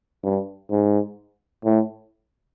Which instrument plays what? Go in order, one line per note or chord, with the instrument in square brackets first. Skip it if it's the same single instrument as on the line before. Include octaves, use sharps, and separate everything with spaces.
[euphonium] G2
G#2
A2